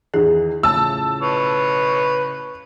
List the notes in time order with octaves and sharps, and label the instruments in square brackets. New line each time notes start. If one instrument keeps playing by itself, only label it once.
[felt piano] E2 D#3 E3 [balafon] G#4
[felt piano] A2 C#3 F3 [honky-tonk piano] A5 E6
[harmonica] B4 C#5